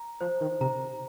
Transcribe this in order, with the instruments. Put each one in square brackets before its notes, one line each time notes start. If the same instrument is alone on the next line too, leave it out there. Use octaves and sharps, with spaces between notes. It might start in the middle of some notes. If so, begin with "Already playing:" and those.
Already playing: [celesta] A#5
[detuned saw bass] F3 [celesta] C5
[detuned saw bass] D#3
[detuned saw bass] C3 [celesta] A#5